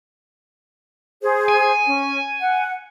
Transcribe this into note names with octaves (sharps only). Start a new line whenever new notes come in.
G#4 C5
G#5
C#4
F#5